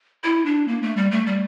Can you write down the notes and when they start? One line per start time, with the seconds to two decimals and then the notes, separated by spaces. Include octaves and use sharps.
0.24 E4
0.46 D4
0.68 A#3
0.83 A3
0.97 G3
1.11 A3
1.27 G3